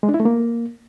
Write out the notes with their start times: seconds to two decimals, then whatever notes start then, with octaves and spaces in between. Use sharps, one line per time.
0.03 G#3
0.09 D4
0.14 E4
0.20 A3
0.25 A#3